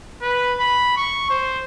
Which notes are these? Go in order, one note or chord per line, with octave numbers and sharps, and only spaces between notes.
B4
B5
C#6
C5